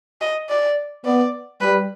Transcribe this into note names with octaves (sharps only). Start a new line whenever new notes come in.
D#5
D5
B3 D5
G3 B4